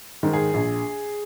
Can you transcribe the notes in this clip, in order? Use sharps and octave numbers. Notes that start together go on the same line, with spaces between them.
G#2 D#3
G#4
A#1